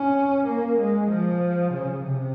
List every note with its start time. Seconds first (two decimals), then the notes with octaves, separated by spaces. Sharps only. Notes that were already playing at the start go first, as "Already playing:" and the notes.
Already playing: C#4
0.47 A#3
0.79 G#3
1.11 F3
1.73 C#3
2.04 C3